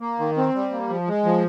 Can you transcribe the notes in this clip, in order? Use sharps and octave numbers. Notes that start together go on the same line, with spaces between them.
A#3
D#3
C4
G3
A#3
F3
G#3
F3